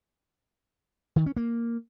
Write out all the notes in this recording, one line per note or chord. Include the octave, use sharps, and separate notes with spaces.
D#3
C#4
A#3